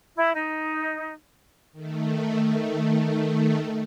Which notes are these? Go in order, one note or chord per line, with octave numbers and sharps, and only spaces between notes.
E4
D#4
D#3 A3